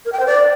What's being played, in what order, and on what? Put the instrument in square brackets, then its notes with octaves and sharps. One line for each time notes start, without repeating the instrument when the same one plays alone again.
[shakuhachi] A#4
G5
C5
D5